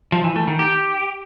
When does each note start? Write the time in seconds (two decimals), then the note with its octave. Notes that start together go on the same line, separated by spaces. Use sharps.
0.12 F3
0.24 E3
0.36 A3
0.47 D#3
0.59 G4